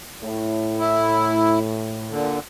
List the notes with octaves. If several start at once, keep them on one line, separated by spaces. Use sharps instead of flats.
A2
E4
A#2 D3